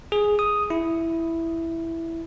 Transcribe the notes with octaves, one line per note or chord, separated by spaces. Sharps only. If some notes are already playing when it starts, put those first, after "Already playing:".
G#4
D#6
E4